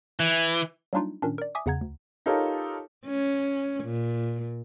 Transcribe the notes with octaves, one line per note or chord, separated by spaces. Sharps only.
E3
F#3 G3 A#3 D4 D#4 F4
A#2 D#3 C#4 D4
A#4 D5
E5 G#5 D6 D#6
E2 C#3 F#5 A#5 G#6
D2
D#4 F4 G4 A4 A#4 C#5
C#4
A#2